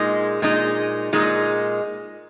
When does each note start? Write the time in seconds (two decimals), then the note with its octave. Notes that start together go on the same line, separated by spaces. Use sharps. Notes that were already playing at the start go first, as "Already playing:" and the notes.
Already playing: A#2 G#3 D#4
0.42 A#2 G#3 D#4
1.13 A#2 G#3 D#4